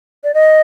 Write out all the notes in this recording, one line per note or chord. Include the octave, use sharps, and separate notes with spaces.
D5
D#5